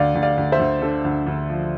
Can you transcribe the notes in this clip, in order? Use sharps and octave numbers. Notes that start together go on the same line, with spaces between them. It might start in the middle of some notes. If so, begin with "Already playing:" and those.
Already playing: D2 D5 F5
D2
D5 F5
D2
C5 E5
D2
D3 A4
D2
D2
F3